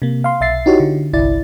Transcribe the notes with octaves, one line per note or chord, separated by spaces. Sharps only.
C3 A#3
F5 C6
B1 E5 A6 C7
D#4 E4 F#4 G4 C#5
D3
G1 C2 E4 D5 A6